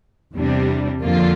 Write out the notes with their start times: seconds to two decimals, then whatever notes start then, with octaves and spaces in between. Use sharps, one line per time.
0.35 E2 C3 G3 D4
1.02 F2 D3 F3 A#3 F4